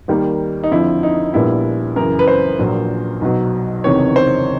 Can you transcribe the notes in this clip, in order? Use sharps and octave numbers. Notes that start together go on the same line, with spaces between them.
D#2 D#3 G3 A#3
D#4
F2 D3 F3 E4
D#4
A#1 A#2 G3 B3 E4
F#2 C#3 E3 A#4
B4
C5
A#1 A#2 F#3
B1 B2 F#3
F#1 E2 C3 D#3 C#5
C5